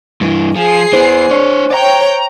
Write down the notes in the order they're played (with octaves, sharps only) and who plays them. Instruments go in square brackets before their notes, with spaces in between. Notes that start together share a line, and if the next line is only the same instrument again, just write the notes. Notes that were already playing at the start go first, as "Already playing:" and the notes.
[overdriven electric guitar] G2 E3
[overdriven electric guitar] F3 [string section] G#4 C7
[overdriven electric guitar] E3 B3 [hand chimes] C5
[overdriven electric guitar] D4 C#5
[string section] C#5 G5 [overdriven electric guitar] D5 A#5